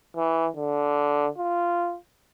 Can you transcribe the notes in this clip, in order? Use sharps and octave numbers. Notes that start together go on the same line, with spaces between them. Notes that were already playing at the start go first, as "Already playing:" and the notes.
E3
D3
F4